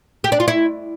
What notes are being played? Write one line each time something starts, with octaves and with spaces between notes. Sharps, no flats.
G4
D4
F4
E4